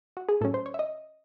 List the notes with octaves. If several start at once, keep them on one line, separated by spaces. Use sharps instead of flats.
F#4
G#4
A2 F#3 C#4 A4
C5
C#5
E5
D#5